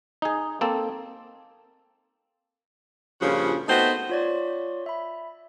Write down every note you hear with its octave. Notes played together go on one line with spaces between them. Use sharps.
D#4 G#4
A#3 C4 A4
G2 A#2 C#3 F3 C#4 F#4
A3 B3 C4 D#4 F#4 C5
F4 C#5 D5
E5 B5